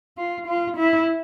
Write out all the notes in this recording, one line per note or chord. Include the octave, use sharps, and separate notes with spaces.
F4
F4
E4